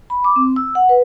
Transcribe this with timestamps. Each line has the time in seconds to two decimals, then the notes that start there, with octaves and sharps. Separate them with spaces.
0.10 B5
0.24 D6
0.36 C4
0.56 E6
0.75 F#5
0.89 B4